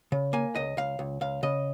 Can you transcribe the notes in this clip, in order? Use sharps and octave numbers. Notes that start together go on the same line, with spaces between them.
C#3
A#3 G#5
C#2 D#5
C#2 F5
C#2
C#2 F5
C#3 D#5